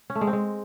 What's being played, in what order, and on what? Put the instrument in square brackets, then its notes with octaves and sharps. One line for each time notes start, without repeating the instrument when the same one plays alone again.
[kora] C#4
A3
G#3
C4
G#3